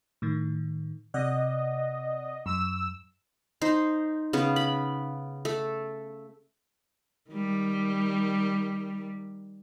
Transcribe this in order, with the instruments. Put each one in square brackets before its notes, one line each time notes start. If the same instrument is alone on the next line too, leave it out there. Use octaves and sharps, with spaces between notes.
[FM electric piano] A2 D#3
[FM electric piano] C3 D5 F#5 [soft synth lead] D#5
[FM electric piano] F#2 [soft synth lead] E6
[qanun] D#4 C5
C#3 B3
B5
A3
[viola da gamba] D#3 G3